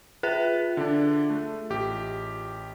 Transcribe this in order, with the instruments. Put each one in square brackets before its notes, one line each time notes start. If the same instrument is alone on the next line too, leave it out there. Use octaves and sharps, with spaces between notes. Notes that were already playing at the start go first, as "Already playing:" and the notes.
[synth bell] F4 G#4 E5 [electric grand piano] B4
[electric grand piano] D3 D4
A3
A1 G4